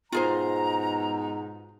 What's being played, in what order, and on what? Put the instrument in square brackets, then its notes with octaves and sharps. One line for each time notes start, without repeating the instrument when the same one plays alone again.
[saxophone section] G#2 B2 D#4 [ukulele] F4 G#4 C5 [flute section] A#5